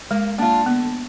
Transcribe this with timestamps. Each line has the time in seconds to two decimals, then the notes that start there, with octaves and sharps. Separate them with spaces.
0.11 G#3 A#3
0.38 A#3 D4 F4
0.66 D3 B3